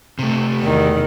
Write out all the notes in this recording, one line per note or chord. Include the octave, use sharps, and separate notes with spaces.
C3 A3
E2 D#3